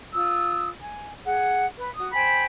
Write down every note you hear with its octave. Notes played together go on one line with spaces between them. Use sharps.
F4 D#6 E6
G#5
G#4 F#5
B4
F#4 D#6
C5 G5 G#5 B5